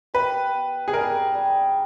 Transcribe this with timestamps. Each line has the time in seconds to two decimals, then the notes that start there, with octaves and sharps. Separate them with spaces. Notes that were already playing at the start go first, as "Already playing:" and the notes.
0.14 G4 B4
0.54 B3
0.88 G#4
0.93 G3 A#4
1.34 G3